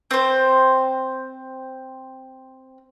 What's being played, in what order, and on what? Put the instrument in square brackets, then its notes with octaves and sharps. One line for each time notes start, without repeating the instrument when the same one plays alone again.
[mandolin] C4 C5